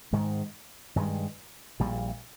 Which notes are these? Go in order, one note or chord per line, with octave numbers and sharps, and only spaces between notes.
G#2 D#3 G#3
G2 D#3 G#3
A#1 A#2 G3